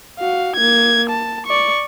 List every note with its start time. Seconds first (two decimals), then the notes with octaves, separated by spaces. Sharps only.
0.20 F#4 F5
0.56 A#3 G#6
1.09 A5
1.46 D5 C#6